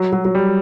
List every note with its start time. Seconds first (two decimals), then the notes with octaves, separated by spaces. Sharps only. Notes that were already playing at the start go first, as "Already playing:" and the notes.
Already playing: F#3
0.13 F#3
0.25 F#3
0.35 G3